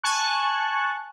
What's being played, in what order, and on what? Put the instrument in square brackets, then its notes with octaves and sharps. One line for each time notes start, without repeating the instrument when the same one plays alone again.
[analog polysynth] G#5 A5 C#6 F#6